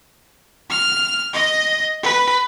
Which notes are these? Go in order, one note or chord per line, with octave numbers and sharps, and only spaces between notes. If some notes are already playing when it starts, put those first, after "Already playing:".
F6
D#5
B4